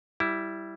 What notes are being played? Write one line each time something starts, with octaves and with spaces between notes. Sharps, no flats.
G3 E4